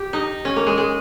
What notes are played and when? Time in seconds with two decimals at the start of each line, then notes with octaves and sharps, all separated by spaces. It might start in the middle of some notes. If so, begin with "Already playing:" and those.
Already playing: G4
0.13 D#4
0.45 C#4
0.56 A#3
0.67 G#3
0.78 G#3